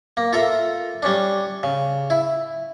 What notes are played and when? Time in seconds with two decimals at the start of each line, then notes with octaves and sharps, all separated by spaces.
0.17 A#3
0.33 F4 A4 A#4 E5
1.02 G3 C#4 D4
1.63 C#3
2.10 E4